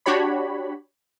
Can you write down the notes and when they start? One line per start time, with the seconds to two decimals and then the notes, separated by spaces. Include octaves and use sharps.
0.06 D4 F#4 G4 C#5 B5